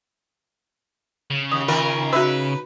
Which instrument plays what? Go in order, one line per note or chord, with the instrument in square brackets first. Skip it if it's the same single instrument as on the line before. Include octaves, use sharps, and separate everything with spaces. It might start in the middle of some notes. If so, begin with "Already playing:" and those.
[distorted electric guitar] C#3
[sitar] D#2 [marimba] D#6
[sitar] D#3 F4 A#4
[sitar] D#4 B4 [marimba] F#4 E5 E6